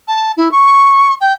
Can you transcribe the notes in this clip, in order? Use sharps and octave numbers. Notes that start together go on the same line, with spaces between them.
A5
E4
C#6
G5